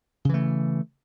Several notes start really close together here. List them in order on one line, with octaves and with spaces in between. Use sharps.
C#3 E3 A3